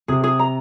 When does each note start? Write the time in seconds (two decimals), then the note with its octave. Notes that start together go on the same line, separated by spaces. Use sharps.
0.08 C3 G#4
0.24 G#4
0.39 A#5